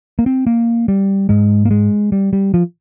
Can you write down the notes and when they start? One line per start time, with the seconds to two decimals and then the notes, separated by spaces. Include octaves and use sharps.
0.19 A#3
0.26 C4
0.47 A#3
0.88 G3
1.29 G#2 G#3
1.65 A#3
1.71 G#3
2.12 G3
2.33 G3
2.54 F3